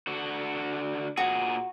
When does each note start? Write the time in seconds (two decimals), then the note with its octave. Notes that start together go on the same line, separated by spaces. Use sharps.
0.07 D3 F#4
1.17 A#2 F#4 G#4